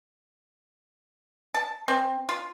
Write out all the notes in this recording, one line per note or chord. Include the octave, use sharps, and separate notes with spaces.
A5
C4
F4